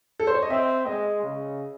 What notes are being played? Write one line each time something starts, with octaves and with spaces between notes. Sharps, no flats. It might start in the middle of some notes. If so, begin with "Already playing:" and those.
A4
C5
C#5
D#5
C4 E5
G#3 D#5
C#3